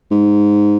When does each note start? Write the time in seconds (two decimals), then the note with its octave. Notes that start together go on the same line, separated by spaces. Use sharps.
0.11 G#2